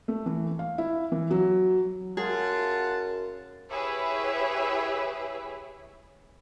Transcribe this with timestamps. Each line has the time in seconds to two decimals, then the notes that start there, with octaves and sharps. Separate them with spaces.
0.08 A3
0.26 E3
0.59 F5
0.78 E4
1.12 E3
1.31 F#3
2.17 F#2 F4 G#4 F#5 A5
3.72 E4 G4 G#4 B4 C#5 E5